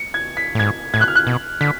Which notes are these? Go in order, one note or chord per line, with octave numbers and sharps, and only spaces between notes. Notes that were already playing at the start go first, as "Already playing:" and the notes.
Already playing: C#7
G#6
B6
A2
G#2 G#6
A2 G#6
F#6
F6
F#6
B2
D3 B6